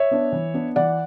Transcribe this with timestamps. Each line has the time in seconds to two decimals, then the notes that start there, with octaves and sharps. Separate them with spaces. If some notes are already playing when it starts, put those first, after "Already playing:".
Already playing: C#5 E5
0.11 B3 D4
0.32 E3
0.54 B3 D4
0.76 E3 D5 F#5